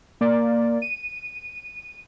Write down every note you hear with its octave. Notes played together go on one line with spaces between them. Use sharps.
A#3 D5
D#7